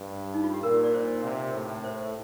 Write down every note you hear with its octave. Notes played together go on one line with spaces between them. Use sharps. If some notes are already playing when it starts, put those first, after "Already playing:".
Already playing: G2
D#4
F4
G4
A#2 A#4
D5
C5
C3
A2
C5